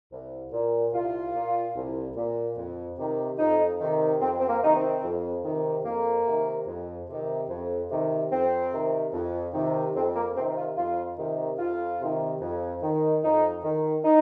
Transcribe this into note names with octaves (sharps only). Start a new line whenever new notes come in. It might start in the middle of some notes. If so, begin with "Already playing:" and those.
C2
A#2
C2 F4
A#2
C2
A#2
F2
C3 D#3
F2 D#4
C3 D#3
F2 C4
C4
A#3
C3 D#3 D#4
C4
F2
C3 D#3
F2 A#3
C3 D#3
F2
C3 D#3
F2
C3 D#3
F2 C4
C3 D#3
F2
C3 D#3
F2 C4
A#3
C3 D#3 C4
F4
F2 F4
C3 D#3
F2 F4
C3 D#3
F2
D#3
F2 D#4
D#3
D#4